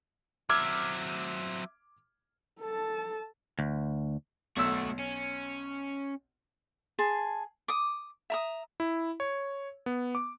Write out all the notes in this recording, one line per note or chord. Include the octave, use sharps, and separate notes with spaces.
F#3 C4 E5 D6 F6 G#6
A4 A5
D2
B1 A3 F#4 E6
C#4
G#4 A5 C6
D6 D#6
E5 A#5 D#6
E4
C#5
B3
D6